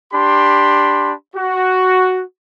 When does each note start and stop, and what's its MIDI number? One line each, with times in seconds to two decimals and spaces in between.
0.12 1.12 62
0.12 1.12 67
0.12 1.12 83
0.12 1.12 84
1.35 2.21 66